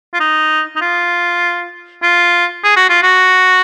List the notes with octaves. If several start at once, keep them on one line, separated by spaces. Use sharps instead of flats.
F4
D#4
D#4
F4
F4
G#4
F#4
F4
F#4